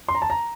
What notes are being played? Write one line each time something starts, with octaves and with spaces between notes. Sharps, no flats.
C6
A#5
A5
A#5